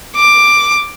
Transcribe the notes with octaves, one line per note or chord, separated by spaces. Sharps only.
D6